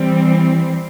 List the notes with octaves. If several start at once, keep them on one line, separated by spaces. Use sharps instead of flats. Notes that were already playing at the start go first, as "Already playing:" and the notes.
Already playing: E3 G3 C4